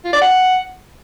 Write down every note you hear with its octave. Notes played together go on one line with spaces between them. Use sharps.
F4
D5
F#5